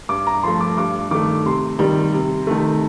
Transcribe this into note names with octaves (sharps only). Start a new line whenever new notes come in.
G2 D6
A#5
F3 A3 C6
D6
G2 D6
D#3 A3 D6
C3 C6
D#3 G3
C3
D#3 A3